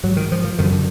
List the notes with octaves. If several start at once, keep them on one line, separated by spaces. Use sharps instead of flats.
G#2 F#3
D#3
F3
F3
F#2 D3 D#3
D3